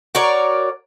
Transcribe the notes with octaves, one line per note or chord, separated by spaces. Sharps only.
F#4 A#4 C#5 D5